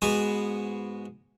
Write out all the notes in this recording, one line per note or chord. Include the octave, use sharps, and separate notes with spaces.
G#2 B3 F#4 G#5